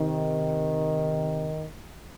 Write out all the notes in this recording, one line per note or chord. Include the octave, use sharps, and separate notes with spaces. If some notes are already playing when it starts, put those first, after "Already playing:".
Already playing: C3 D#3